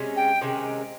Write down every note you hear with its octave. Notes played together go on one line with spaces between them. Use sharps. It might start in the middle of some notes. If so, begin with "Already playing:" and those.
Already playing: C3 G#3 C#4
G5
C3 D#3 G#3 C#4